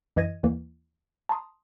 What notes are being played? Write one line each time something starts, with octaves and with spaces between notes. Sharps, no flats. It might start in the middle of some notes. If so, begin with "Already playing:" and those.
F#2 E3 D#5 G#6 A#6 D#7
D#2 E3 A#3
A5 A#5 C6 D#6